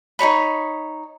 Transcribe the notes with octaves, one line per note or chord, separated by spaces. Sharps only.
D#4 G#4 C#5 B5